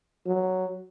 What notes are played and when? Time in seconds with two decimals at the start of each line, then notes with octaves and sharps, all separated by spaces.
0.27 F#3